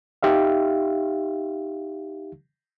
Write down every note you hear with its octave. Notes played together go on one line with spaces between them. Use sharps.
D#4 G4 E5 F5